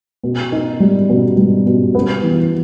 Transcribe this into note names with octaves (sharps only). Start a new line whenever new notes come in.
B2
D#4
G3
B2
G3
B2
B3
E3